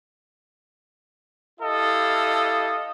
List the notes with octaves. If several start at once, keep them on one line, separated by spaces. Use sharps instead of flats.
E4 G4 A4 D#5 F5